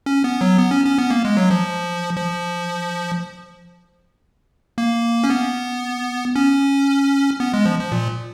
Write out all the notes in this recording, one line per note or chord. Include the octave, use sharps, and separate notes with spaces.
C#4
B3
F#3
B3
C#4
C#4
B3
A#3
G#3
F#3
F3
F3
A#3
C#4
B3
C#4
B3
G#3
F3
F3
A#2